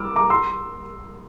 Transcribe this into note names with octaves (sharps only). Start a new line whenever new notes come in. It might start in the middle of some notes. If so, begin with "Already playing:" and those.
Already playing: D6 E6 F6
A#5 D6
C6 E6